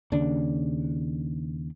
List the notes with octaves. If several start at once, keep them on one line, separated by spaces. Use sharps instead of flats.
D#2 C#3 D4